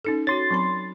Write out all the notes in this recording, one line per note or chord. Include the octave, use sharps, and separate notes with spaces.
C#4 D#4 A4
F#4 C#5 C6 A6
F#3 C4 B5